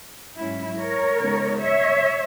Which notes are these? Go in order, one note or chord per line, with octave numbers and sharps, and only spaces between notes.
G#2 F#3 C#4 E4
A#4 C#5
C#3 G#3 B3 D#4
C#5 E5